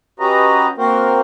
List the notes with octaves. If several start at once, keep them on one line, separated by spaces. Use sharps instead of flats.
C#4 F#4 G4 B4 D#5 A#5
A#3 C4 F#4 A#4 C5